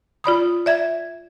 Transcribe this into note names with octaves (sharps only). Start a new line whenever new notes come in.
F4 D5 B5 D#6
D5 E5 G#6